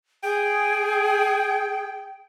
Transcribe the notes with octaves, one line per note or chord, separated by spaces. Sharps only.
G#4 G5